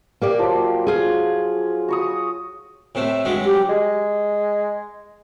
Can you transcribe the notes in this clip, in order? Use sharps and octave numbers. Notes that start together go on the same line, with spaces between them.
A#3 G4 D5
F3 F#3 C6
F4 G#4
F#4 C#6 D#6
A2 C3 A3
G2 F#3 G#3
G4
G#3